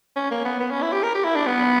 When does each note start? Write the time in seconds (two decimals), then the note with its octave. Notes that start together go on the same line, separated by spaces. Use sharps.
0.16 C#4
0.31 A#3
0.45 B3
0.60 B3
0.71 C#4
0.82 E4
0.93 G4
1.03 A#4
1.15 G4
1.25 E4
1.36 D4
1.47 B3